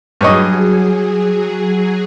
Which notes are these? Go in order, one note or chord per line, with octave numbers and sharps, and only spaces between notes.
G2 F#3 G#4 C#5 D#5